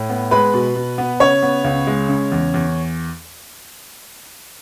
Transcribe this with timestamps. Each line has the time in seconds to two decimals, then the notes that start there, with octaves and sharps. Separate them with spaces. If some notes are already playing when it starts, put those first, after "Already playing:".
Already playing: A2
0.09 B3
0.31 G#3 B4 B5
0.54 B2
0.76 B2
0.98 B3
1.20 C#3 C#5 C#6
1.42 B3
1.64 C#2
1.87 G#3
2.09 C#3
2.32 E2
2.54 E2